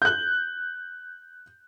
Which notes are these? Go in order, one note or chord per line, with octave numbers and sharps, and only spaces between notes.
F#6 G6